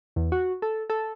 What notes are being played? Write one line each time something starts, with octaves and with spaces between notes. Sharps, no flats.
E2
F#4
A4
A4